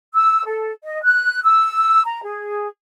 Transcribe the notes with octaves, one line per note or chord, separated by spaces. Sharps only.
E6
A4
D#5
F#6
E6
A#5
G#4